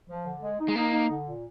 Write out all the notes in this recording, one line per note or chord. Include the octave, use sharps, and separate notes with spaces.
F3
D3
G#3
D#4
G#3
A#3 D#4
D#4
D3
A#2